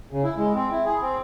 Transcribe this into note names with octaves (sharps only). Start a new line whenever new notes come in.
C#3
E4
G#3
C4
E4
G#4
C4